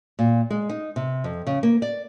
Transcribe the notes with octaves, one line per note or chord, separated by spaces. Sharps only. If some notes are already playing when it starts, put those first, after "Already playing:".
A#2
G#3
D#4
C3
F2
C#3
A#3
D5